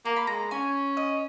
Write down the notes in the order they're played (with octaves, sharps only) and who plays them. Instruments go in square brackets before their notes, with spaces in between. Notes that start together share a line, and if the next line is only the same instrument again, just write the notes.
[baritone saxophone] A#3 [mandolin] A#5
[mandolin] B5
[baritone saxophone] G#3 [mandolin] A#5
[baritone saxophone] C#4 [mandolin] G#5
[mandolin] D#5